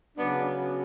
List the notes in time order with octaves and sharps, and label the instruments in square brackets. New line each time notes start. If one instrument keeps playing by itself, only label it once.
[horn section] C#3 F#3 B3 D4